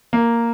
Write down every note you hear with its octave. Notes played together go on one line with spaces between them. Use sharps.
A#3